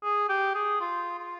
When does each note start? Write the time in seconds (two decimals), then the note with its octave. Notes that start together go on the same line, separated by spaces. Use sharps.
0.03 G#4
0.29 G4
0.55 G#4
0.80 F4
1.19 F4